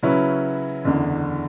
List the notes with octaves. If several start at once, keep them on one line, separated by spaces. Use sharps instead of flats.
C#3 F#3 C#4 E4 B4
F#1 E2 D3